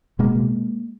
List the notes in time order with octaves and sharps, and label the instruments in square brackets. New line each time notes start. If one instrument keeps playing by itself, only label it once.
[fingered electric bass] B2 G#3 A#3
B2